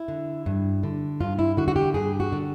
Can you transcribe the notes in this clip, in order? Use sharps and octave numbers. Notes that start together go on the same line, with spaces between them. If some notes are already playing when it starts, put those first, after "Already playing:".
Already playing: E4
D3
G2
D3
G2 F4
E4
D3 F#4
F#4
G4
G2 G#4
F#4
D3